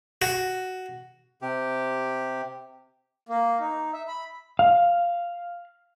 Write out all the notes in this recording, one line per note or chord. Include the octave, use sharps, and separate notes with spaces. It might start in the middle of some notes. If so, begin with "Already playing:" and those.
F#4
C3 G4
A#3
D#4
E5
B5
F5